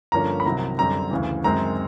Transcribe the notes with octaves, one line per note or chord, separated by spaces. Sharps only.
G2 D3 F3 A#3 C#4 A#5
B5
C2 C3 D#3 F#3 A#5
F#2 D3 G3 C4 A#5
D2 C#3 E3
F#2 D#3 G#3 C4 A#5